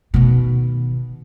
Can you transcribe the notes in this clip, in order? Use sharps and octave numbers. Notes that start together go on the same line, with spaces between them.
B2 D#3